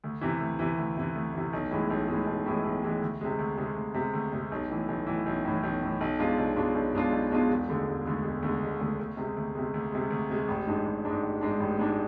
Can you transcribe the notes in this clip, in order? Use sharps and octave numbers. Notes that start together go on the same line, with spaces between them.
D2
C3 E3
D2
C3 E3
D2
C3 E3
D2
C3 E3
B1
A2 E3 G#3
B1
A2 E3 G#3
B1
A2 E3 G#3
B1
A2 E3 G#3
D2
C3 G#3
D2
C3 G#3
D2
C3 G#3
D2
C3 G#3
B1
A2 E3
B1
A2 E3
B1
A2 E3
B1
A2 E3
B1
B2 G#3 D4 F4
B1
B2 G#3 D4 F4
B1
B2 G#3 D4 F4
B1
B2 G#3 D4 F4
E1
D2 D3 G#3
E1
D2 D3 G#3
E1
D2 D3 G#3
E1
D2 D3 G#3
D2
C3 G#3
D2
C3 G#3
D2
C3 G#3
D2
C3 G#3
A1
G#2 G#3 D4
A1
G#2 G#3 D4
A1
G#2 G#3 D4
A1
G#2 G#3 D4